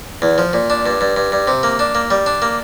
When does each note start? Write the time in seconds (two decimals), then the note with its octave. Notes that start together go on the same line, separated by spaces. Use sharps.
0.22 E2
0.38 F3
0.53 A#2
0.70 D4
0.86 G2
1.01 G2
1.16 G2
1.32 G2
1.47 C3
1.63 A#3
1.79 D4
1.95 A#3
2.10 G3
2.26 D4
2.42 A#3